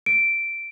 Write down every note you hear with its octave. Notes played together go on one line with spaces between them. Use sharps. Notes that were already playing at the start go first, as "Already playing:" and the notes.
D7